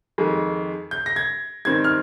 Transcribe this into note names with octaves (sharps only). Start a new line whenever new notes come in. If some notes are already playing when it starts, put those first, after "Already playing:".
F2 D#3 G#3
G6
A#6
G#6
G#2 D#3 G3 C4 G#6
F6